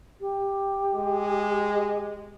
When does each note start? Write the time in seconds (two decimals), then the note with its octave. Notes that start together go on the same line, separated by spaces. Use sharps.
0.21 G4
0.94 G#3